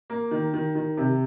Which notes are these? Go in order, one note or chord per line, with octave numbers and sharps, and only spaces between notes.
A#3
D#3
D#3
D#3
C3